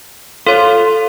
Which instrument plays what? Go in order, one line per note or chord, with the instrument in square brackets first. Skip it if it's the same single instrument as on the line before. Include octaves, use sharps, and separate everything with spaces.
[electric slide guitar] F4 [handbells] A4 C#5